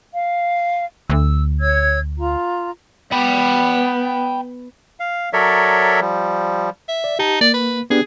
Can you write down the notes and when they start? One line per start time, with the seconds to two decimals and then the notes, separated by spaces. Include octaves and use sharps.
0.13 F5
1.10 D2 E6
1.59 C#5 E6 G#6
2.18 F4 A#5
3.12 B3 G5 B5
5.00 F5
5.33 F#3 A4 A#4 C#5 D5 E5
6.01 F3 G3
6.88 E5
7.04 D5
7.19 D#4 G4 A5
7.41 A#3 D5
7.53 B4
7.90 B3 D4 G4 G#4